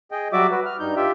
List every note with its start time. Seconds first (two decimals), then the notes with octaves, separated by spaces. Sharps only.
0.11 G#4 D#5 G5
0.33 F#3 G3 F#4 D5 E5 D6
0.51 F#4 B4
0.66 F6
0.80 G2 G3 D#4 G6
0.96 F4 G4 E5 G5